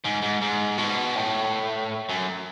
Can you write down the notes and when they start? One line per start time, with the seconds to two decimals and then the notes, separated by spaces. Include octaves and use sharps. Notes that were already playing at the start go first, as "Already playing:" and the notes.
0.04 G#2
0.22 G#2
0.42 G#2
0.78 B2
1.16 A2
2.09 F#2